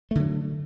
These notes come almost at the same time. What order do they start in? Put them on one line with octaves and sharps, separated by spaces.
A3 D3 F#3